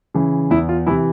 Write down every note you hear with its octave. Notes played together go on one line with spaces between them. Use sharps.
C#3 E3
E2 E4
F4
C3 E3 E4